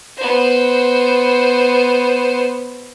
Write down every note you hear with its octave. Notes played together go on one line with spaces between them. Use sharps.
B3 C5